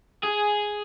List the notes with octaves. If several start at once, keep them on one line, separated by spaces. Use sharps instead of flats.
G#4